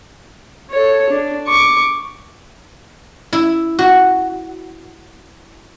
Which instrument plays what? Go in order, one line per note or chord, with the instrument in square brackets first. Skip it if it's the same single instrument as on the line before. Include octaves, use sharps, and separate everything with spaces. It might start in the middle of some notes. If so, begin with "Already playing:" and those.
[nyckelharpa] A4 C#5
D4
C#6 D6
[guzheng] E4
F#4